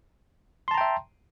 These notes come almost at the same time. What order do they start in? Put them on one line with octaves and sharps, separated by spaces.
C6 A5 A#5 G5 E5